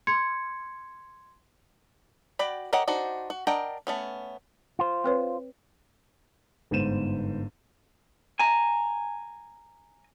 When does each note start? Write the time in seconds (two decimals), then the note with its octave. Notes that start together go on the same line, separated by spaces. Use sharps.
0.07 C6 G#6 C#7
2.39 F#4 D5 G5 B5
2.73 G4 A#4 C#5 D#5 F#5
2.88 D4 D#4 F#4 C5
3.30 F#4
3.47 D4 A#4 D#5 F#5 G5
3.87 A3 B3 C#4
4.79 F4 C5
5.04 C4 B4 C#5
6.71 G1 G#2 B3 C5 D#7 E7
8.39 G#5 A#5